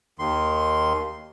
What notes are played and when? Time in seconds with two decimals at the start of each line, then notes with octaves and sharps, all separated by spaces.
0.19 D#2 D#3 C6